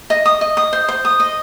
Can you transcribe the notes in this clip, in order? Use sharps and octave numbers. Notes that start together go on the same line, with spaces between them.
D#5
D#6
D#5
D#6
C5
C5
D#6
D#5